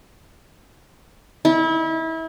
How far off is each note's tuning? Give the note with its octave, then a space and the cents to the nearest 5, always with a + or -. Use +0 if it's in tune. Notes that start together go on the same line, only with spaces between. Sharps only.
E4 -30